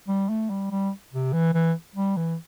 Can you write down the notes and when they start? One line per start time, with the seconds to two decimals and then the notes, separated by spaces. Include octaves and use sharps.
0.08 G3
0.29 A3
0.50 G3
0.71 G3
1.13 C3
1.33 E3
1.54 E3
1.96 G3
2.17 E3